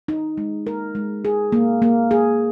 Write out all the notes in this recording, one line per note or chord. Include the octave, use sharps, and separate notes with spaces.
D#4
G#3
A#4
G#3
G#4
A#3
A#3
G#4